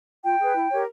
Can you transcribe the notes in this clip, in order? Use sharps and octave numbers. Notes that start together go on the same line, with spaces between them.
F4 G5
G#4 B4
E4
G4 A#4 C#5